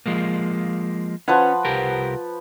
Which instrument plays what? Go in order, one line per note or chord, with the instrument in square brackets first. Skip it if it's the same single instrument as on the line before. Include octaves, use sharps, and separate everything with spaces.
[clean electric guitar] F3 G#3 A#3
[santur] F3 B4 F#5 [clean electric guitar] C#4
[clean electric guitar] C2 G4 A#4